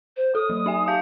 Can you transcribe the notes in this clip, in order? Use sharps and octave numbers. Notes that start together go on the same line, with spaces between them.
C5
A4 D#6
F#3
D#4 E5 G#5
G4 F5 A5 G6